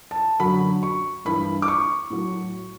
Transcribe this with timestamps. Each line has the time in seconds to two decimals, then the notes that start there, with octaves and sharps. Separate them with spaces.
0.11 A5
0.40 F#2 D3 F#3 B5
0.83 C#6
1.25 G2 E3 B5
1.62 D6
1.68 C#6
2.10 A2 F#3